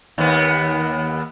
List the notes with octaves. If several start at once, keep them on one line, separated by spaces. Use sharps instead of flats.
D#2 B3